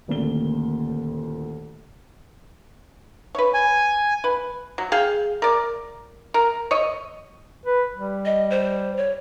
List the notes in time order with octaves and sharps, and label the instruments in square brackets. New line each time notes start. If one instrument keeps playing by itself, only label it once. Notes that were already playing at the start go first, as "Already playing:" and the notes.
[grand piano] D#1 D2 A#2 G7
[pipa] B4 C#5
[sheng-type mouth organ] G#5
[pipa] B4
F#3
G#4 F5 G5
A#4 D5
A#4
C#5 D#5
[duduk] B4
G3
[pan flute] D#5
C5
C#5